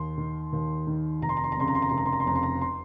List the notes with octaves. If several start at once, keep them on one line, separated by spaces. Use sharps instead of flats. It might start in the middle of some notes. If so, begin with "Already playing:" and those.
Already playing: D#2 C6
D#3
D#2
D#3
F1 A#5
C6
A#5
C6
A#5
F2 C#3 C6
A#5
C6
A#5
F1 C6
A#5
C6
A#5
C6
F2 C#3 A#5
C6
A#5
C6